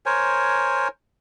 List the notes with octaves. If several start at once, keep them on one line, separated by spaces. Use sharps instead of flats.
A#4 C5 C#5 G#5